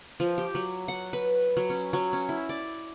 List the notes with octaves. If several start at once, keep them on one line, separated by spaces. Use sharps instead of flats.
F3
G4
F#3
F#5
B4
F#3
C#4
F#3
C#4
E4
D5